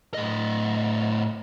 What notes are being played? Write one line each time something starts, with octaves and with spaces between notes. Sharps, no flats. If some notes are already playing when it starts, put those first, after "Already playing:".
A2 D#5